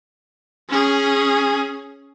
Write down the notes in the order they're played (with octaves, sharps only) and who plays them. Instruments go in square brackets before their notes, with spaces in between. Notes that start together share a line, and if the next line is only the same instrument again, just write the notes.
[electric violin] C#4 G#4